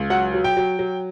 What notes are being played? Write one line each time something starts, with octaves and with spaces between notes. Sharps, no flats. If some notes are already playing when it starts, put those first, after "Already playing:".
Already playing: C#2
F#3 F#5
F#3
G5
F#3
F#3